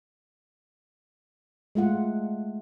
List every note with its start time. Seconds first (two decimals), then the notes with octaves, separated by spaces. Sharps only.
1.75 G#3 A3 F4 F#5